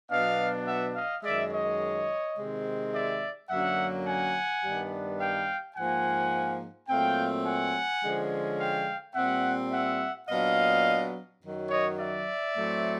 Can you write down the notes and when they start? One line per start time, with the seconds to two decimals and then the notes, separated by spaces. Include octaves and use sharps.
0.11 B2 F#3 B3 D4 D#5 F5
0.67 E5 F#5
0.95 D#5 F5
1.24 F#2 D#3 G#3 D5 E5
1.52 C#5 D#5
2.36 C3 D#3 G#3 C4
2.93 D5 E5
3.50 F#2 D3 F#3 A#3 C#4 E5 F#5
4.06 F#5 G#5
4.63 G2 D#3 G3 B3 D4
5.19 F5 G5
5.76 G#2 F3 A#3 F#5 G#5
6.89 A#2 F#3 A3 C4 F5 G5
7.46 F#5 G#5
8.02 D3 F3 G#3 C#4
8.59 F5 G5
9.15 A#2 G3 C4 E5 F#5
9.71 E5 F#5
10.28 A#2 F#3 B3 D4 D#5 F5
11.41 F#2 D#3 F#3
11.69 C#5 D#5
11.98 D5 E5
12.55 A2 F#3 A3 C4